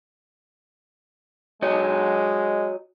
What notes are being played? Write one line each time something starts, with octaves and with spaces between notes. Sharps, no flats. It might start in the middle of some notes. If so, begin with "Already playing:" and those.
G#3 F#4 C#5 D#5